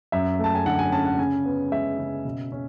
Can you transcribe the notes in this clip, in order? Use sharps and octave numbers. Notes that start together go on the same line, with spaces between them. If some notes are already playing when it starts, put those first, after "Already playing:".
F#2 E5
A3 A5
G#5
D3 F#5
G#5
C#4 A5
F#5
C#3 G#5
B3
G#3 E5
C#3
B2
C#4